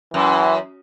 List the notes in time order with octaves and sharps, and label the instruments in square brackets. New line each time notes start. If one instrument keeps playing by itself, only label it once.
[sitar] F#2 [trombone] E3